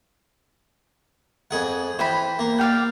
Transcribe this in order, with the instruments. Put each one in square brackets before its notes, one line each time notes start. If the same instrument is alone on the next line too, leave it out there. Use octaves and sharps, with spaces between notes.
[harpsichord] F2 G#4 F#5
[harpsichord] E3 [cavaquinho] C5 G5 B5
[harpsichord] A#3
[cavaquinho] D5 F5 G5